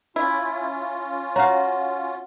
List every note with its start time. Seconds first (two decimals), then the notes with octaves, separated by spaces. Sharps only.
0.16 C#4 E4 F4
1.36 F#4 C#5 F5 A#5